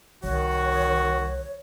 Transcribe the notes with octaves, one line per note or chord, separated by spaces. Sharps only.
C2 D#3 F#4 C#5